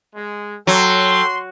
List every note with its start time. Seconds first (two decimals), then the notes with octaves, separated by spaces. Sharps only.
0.15 G#3
0.67 F#3 A4 G5 C6